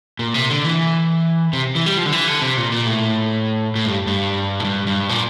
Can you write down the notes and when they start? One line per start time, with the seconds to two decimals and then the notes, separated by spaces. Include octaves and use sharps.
0.19 A#2
0.34 C3
0.49 D3
0.64 E3
1.53 C3
1.75 E3
1.86 G3
1.98 F3
2.06 D3
2.12 E3
2.28 D3
2.42 C3
2.57 A#2
2.72 A#2
2.86 A2
3.75 A2
3.86 G2
4.07 G2
4.60 A2
4.64 G2
4.87 G2
5.09 A#2